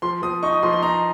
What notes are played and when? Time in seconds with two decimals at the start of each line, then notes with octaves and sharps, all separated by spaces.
0.02 F3 C6
0.22 F3 D#6
0.43 D#4 C#6
0.53 D#6
0.63 F3 C6
0.73 C6
0.83 D#4 A#5